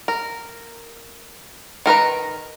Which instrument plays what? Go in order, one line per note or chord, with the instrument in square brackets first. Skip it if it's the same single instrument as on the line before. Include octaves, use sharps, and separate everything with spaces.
[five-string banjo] A#4
D#3 A#4 B4 A#5